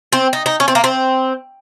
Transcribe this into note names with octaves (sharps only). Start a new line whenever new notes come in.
C4
D#4
D#4
C#4
C4
A#3
C4